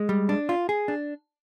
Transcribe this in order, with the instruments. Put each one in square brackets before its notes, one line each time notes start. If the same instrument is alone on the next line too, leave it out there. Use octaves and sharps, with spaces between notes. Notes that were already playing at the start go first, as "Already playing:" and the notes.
Already playing: [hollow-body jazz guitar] G#3
G3
D4
F4
G#4
D4